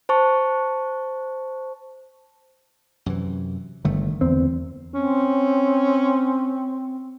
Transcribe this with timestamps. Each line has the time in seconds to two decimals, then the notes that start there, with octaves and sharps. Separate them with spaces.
0.09 C5 A5 C#6
3.06 F#2 C3 E3
3.85 G1 D3 D#3 A3
4.21 E2 C4
4.94 C4 C#4